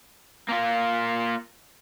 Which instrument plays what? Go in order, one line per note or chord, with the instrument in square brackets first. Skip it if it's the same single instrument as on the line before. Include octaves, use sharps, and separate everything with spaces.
[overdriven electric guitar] A#3 F4